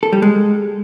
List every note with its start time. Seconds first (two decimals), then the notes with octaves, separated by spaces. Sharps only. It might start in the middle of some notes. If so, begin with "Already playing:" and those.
0.03 A4
0.13 G3
0.22 G#3